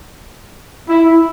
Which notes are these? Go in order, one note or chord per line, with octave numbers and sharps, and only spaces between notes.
E4